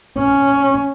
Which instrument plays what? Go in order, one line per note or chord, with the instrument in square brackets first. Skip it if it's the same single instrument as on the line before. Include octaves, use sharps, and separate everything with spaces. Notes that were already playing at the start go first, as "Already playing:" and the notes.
[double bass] C#4